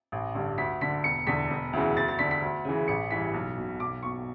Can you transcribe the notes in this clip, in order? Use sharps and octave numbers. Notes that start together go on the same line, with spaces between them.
A1
G2 D3
D2 B6
D3 B6
E1 C#7
E2 D3 B6
E1
D2 C#3 E3
D2 A6
A6
D3 B6
B6
D2
C#3 E3
A1 C#7
G2 E3 B6
B1
B2
B1 D6
B2 C#6